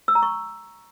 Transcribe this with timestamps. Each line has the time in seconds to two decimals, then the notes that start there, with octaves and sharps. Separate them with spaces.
0.08 E6
0.15 A#5
0.23 C#6